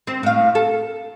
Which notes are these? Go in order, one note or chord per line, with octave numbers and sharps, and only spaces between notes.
C4
A2 F5
A4